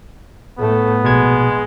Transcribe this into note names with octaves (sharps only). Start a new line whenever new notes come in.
A2 A3 B3
A#1 B2 G#3 G#6